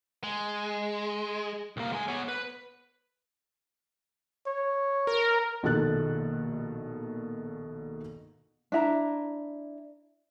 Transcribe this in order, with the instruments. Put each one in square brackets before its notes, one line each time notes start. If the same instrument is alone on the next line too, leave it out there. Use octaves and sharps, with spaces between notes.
[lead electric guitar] G#3
C2 A#3
G#3 G#5
B3 C#5
B4
[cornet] C#5
[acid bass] A#4
[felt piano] A#1 B2 D#3 A4 F#6 A6
[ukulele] D4 E4 E5 A#5